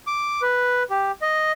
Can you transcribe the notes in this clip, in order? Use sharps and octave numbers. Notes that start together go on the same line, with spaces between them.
D6
B4
G4
D#5